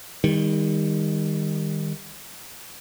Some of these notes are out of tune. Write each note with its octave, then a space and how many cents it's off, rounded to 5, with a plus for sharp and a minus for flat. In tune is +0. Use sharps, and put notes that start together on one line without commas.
D#3 +0 G3 +35